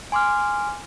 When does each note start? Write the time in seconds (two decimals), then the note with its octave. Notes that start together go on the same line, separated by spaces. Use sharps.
0.12 G#5 C6 D6 F6